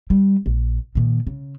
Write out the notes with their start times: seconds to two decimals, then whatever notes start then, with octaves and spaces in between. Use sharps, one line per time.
0.10 G3
0.46 A#1
0.95 A#2 D#3
1.27 C#3